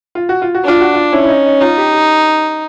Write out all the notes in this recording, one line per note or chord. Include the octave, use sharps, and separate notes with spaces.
F4
F#4
F4
F#4
D4 F4
F#4
F4
C#4 E4
E4
D#4
D#4
D#4 F4
G4
G4